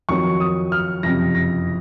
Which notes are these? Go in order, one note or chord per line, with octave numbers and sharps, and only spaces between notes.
F2 D#3 F#3 C#6
D#6
F6
F#1 F2 C3 A#6
A#6